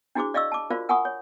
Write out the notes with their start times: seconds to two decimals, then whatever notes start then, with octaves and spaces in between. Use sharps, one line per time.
0.15 D4 E4 F#4 G#4 C5 D6
0.34 D5 D#5 F5 C#6 E6
0.52 A5 D6
0.70 F4 F#4 A#4 C5 D5 F5
0.89 A#4 F#5 G#5 B5 C#6 D#6
1.05 C#5